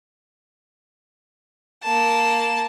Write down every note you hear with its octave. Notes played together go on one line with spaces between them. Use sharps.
A#3 A5